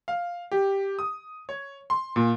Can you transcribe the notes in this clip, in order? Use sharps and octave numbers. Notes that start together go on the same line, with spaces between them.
F5
G4
D#6
C#5
C6
A#2